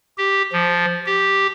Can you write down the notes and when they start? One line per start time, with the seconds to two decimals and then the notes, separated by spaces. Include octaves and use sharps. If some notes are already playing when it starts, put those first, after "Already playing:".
0.18 G4
0.52 F3
1.06 G4